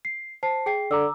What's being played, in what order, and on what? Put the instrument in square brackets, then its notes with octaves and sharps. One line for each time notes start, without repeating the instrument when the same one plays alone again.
[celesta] C7
C5 A5 C7
G#4 G5 C7
[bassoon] D3 [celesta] A#5 D6 E6